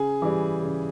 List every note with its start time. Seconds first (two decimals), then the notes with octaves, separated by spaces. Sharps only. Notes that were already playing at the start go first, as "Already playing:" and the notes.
Already playing: C#3 G#4
0.22 E3 G3
0.62 C#3